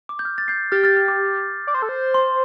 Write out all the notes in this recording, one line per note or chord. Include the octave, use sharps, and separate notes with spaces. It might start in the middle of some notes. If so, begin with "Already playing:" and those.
D6
G6
F6
A6
G6 C7
G4 F6 A6
F6 A6
F6
D6
D5
C5
A4
C5
C6